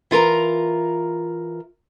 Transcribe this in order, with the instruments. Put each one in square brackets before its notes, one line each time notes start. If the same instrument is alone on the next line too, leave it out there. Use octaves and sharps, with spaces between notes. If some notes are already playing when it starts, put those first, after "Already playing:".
[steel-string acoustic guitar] E3 F4 A#4 A#5